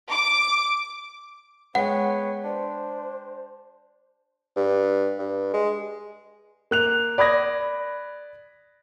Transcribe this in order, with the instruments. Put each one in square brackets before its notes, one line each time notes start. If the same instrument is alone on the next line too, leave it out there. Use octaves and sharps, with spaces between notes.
[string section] D6
[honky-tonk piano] G#3 G5 [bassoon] B3 [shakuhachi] C#5 [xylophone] F#5
[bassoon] D4 [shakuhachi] C5
[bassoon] G2
G2
G#3
[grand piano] A#3 F#6 F7
D5 B5 D#6 G#6 A#6